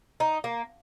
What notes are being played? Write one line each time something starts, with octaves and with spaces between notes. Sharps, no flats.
D#4
A#3